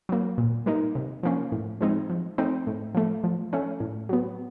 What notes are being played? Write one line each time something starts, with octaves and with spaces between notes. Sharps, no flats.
F#3 A#3
A#2
G3 A#3 D#4
C3
F3 A#3 C#4
A2
F3 G#3 C4 D#4
F3
A3 C4 D#4
A2
F3 A3
F3
A3 C#4
A2
F#3 B3